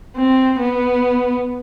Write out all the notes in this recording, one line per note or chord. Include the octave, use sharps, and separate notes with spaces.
C4
B3